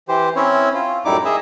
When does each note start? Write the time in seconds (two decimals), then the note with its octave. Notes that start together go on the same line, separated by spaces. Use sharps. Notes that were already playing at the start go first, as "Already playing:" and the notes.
0.08 E3 G4 C5
0.36 C4 C#4 E4 C#5
0.74 F4
1.05 F#2 A2 G3 D#4 E4 D6
1.25 G#4 D#5 E5